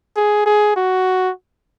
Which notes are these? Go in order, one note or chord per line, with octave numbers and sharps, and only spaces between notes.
G#4
G#4
F#4